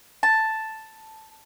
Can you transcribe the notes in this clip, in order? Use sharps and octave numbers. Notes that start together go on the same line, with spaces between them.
A5